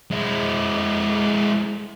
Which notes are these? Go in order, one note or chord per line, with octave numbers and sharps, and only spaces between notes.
G#3 E4